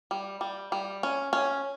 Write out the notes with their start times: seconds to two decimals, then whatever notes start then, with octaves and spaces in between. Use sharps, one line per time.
0.11 G3
0.41 G3
0.72 G3
1.03 C#4
1.33 C#4